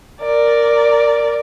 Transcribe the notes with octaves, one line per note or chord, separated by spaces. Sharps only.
A#4 D5